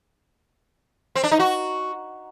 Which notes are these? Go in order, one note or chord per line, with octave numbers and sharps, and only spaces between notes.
C4
D4
D#4
F#4